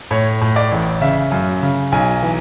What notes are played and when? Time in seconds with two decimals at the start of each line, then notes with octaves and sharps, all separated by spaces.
0.11 A2 C#5
0.41 A2
0.56 D5
0.71 A1
1.01 C#3 E5
1.31 F#2
1.62 C#3
1.92 B1 G#5
2.23 E3